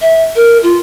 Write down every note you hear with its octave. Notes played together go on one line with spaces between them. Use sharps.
E5
A#4
F4